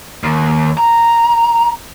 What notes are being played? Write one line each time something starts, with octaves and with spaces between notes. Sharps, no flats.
D#2
A#5